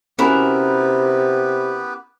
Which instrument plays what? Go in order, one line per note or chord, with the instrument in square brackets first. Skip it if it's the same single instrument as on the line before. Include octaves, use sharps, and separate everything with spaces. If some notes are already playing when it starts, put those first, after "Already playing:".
[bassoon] C3 [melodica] B3 G4 B4 [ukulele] C#4 F#4 [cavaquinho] E4 A#4